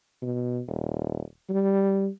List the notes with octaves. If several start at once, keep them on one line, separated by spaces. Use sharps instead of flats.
B2
D#1
G3